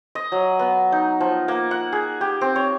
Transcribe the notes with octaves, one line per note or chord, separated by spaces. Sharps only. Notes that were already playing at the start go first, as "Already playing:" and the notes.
D#5
F#3
B3
D#4
F3
A#3
F#5
G#4
G4
C4
C#5